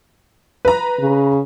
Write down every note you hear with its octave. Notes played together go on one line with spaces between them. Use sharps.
B4 A#5
C#3